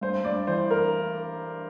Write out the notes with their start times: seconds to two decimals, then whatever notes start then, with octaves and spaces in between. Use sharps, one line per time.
0.01 G2 C5
0.24 G2 D5
0.47 E3 C5
0.70 A#4